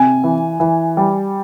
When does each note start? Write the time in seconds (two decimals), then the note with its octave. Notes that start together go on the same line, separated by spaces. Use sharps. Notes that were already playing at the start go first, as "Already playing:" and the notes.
Already playing: C3 G#5
0.24 E3
0.60 E3
0.97 G3